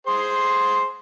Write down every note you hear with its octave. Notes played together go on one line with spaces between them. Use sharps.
G#4 C5 C6